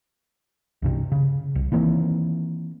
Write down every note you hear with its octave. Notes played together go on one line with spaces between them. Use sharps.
C2 G2 C3
C#3
C2
D#3 E3 A#3 C4